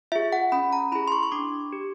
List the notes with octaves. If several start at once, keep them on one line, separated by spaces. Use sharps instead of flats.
F4 G#4 E5
F#5
C#4 B5
A#5
E4 G#4 B5
C6
C#6
C#6
D4 D6
G4